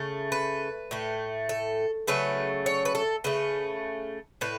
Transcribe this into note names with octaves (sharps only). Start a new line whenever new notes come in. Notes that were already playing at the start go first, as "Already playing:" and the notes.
Already playing: C#3 A3
B4
A2 A3
A4
C#3 F#3 A3 B4
C#5
B4
A4
C#3 A3 B4
A2 B4